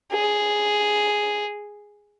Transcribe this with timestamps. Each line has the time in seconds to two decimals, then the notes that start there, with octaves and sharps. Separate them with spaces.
0.12 G#4